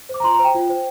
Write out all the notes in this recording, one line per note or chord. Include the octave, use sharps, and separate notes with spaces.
C5 D6
A#5
F4 C6
A#5
C5
G5
F4
C5